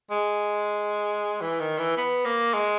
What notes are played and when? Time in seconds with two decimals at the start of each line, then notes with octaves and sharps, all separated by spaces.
0.11 G#3
1.41 E3
1.60 D#3
1.79 E3
1.97 B3
2.25 A#3
2.53 G#3